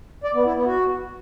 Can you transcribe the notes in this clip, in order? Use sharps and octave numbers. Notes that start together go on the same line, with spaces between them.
D5
B3
E4
B3
F#4